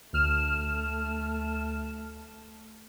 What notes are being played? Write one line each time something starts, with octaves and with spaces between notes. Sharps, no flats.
D2 A3 F6 E7